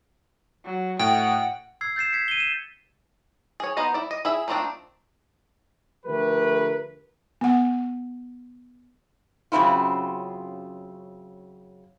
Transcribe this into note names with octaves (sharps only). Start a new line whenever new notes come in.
F#3
A2 F#5 G5
E6 G#6 C7
G6 A6 C7 E7
G#6 B6 C#7
D#7 G7
E7
G#4 C#5
B3 D#4 C5 D#5
E4 D5
D#5
E4 G#4 E5
D#3 F3 A3 C4 D4
D3 F3 A3 G4 A#4 B4
B3 F#5
F#2 C#3 C4 E4 F4